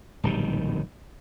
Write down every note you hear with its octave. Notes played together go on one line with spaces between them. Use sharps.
D1 A#1 D#3 G3